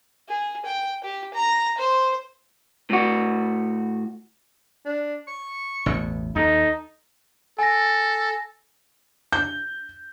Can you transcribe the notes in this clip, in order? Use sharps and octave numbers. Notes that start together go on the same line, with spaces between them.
G#4
G5
G4
A#5
C5
A2 F#4
D4
C#6
A1 E2 B2
D#2 D#4 A4
A4 G#5 A#6
G6